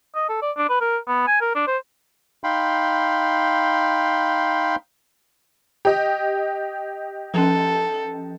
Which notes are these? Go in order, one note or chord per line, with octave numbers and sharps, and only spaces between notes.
D#5
A4
D5
D4
B4
A#4
B3
G#5
A#4
D4
C5
D#4 F5 G5 B5 C6
G4 D#5
F3 C#4 A4